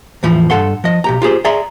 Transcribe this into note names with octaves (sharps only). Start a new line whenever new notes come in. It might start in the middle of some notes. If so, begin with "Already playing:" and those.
E2 A2 E3 F3 B5
G2 B2 A4 F#5 C6
F3 D#5
B1 G4 A#5
F4 G4 G#4 C5
G#4 D5 E5 A#5 C6